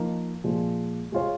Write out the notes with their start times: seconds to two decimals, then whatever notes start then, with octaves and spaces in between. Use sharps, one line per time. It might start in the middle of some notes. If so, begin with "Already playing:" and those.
Already playing: F3 A#3 D#4 A#4
0.44 A#2 F3 G#3
1.12 G#3 F4 C#5